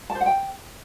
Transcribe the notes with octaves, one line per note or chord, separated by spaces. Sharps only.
A5
C5
F#5
G5